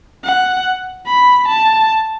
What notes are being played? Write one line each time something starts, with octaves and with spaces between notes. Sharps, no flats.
F#5
B5
A5